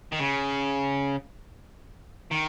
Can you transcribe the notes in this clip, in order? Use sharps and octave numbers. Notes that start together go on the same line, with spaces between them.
D#3
C#3
D#3